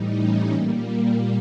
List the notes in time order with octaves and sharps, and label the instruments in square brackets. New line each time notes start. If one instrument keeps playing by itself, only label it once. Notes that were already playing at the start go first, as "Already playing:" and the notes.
Already playing: [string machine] A2 E3 G3 D#4
C#4
A#2 G3 A#3